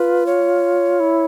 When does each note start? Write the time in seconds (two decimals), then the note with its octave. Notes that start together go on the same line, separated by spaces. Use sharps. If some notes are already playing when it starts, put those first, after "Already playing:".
Already playing: F4 B4
0.26 C#5
1.00 E4